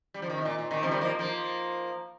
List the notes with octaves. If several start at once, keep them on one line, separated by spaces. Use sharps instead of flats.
G3
F3
D#3
C3
A#2
A#2
A#2 D#3
C3 F3
D#3 G3
F3 A#3
F3 A#3